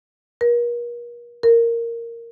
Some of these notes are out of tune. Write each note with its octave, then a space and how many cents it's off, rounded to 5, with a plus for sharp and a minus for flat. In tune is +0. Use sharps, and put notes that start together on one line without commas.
A#4 +40
A#4 -10